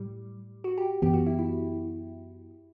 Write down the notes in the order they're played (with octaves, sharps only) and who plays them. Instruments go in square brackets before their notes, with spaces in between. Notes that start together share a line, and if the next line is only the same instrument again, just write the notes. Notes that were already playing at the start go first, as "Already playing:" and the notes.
Already playing: [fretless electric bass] A2 [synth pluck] G3
[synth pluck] F#4
G4
[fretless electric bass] F#2 E3 B3 [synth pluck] G4
[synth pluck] F#4
E4
E4